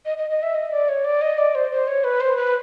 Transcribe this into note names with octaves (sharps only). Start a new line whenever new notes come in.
D#5
D#5
D#5
E5
D#5
D5
C#5
D5
D#5
D5
C5
C5
C#5
B4
C5
B4